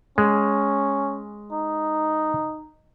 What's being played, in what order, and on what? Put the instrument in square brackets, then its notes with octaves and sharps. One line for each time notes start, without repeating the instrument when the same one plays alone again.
[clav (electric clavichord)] G#3 [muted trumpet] C#4
[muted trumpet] D#4